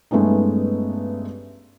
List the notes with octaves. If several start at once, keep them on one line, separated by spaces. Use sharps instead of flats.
G2 G#3 A3 B3 C#4 D#4